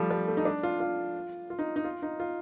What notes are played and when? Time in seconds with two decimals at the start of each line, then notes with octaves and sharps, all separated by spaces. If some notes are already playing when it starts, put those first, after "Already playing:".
Already playing: F3 G3 A3
0.11 G3
0.28 A3
0.37 D#4
0.45 D4
0.63 F4
0.80 F4
1.50 F4
1.59 D#4
1.76 D#4
1.84 F4
2.02 D#4
2.20 F4